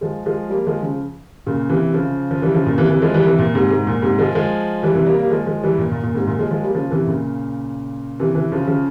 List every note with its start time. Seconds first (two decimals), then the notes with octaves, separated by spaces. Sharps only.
0.01 F3 G#3
0.26 F3 G#3
0.49 G3 A#3
0.66 F3 G#3
0.82 C#3 F3
1.47 A#2 C#3
1.70 C3 E3
1.94 C#3 F3
2.31 F3
2.42 E3 G3
2.55 C#3 F3
2.66 A#2 C#3
2.78 C3 E3
2.90 C3 E3
3.02 F3 G#3
3.14 E3 G3
3.26 C3 E3
3.39 A#2
3.55 G#2 C3
3.71 G#2
3.87 A#2
4.02 G#2 C3
4.18 F3 G#3
4.35 F3 G#3
4.83 E3 G3
4.95 C3 E3
5.06 G3 A#3
5.18 G3 A#3
5.30 F3 G#3
5.46 F3 G#3
5.63 E3 G3
5.78 A#2
5.91 A#2
6.03 A#2
6.14 G#2 C3
6.27 A#2
6.39 F3 G#3
6.51 F3 G#3
6.63 G3 A#3
6.75 C#3 F3
6.91 C3 E3
7.07 A#2 C#3
8.20 C3 E3
8.35 C3 E3
8.52 C#3 F3
8.67 C#3 F3